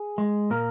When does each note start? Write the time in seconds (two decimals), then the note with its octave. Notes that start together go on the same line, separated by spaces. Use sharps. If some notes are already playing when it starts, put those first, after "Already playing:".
Already playing: G#4
0.18 G#3
0.50 A#2 A#3 A#4